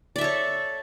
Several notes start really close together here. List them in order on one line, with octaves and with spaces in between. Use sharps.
D5 E5 A4 C#5